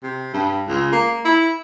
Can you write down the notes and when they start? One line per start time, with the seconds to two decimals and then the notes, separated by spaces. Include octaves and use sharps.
0.03 C3
0.34 G2
0.68 C#2
0.92 A#3
1.25 E4